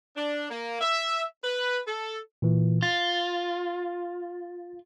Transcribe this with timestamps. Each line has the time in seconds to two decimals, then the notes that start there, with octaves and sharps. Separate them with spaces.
0.16 D4
0.50 A#3
0.81 E5
1.44 B4
1.87 A4
2.42 A#2 E3
2.83 F4 A6